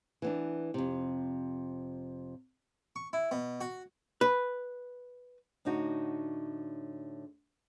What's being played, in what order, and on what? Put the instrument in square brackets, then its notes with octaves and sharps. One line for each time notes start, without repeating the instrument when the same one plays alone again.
[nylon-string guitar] E3 B3 D4
F2 C3
[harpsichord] C#6
E4
B2
F#4
[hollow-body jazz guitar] B4
[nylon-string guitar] A2 D3 D#4 F#4